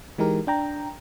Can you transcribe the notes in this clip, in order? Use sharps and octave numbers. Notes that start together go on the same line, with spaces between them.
E3 G#3 D#4 G4 A#4
D4 G5 A#5